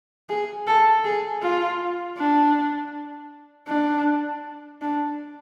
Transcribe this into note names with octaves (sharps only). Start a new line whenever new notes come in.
G#4
A4
G#4
F4
D4
D4
D4